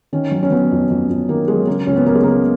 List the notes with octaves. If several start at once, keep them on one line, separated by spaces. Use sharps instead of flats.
D#3 C#4
F#3
C#4
F#3 B3
F2
F2
F2
D#3 A#3
F#3 G#3
C#3 A#3
C#2 C#4
B3
F#3 A#3
G#3
C#3 A#3